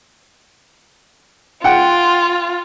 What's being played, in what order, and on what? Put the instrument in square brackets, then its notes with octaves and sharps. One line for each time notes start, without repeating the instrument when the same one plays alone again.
[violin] F4 [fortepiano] F#5 G5